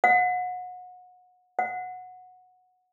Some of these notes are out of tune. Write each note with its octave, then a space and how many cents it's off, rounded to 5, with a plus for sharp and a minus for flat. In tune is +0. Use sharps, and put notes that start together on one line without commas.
F#5 -30
F#5 -15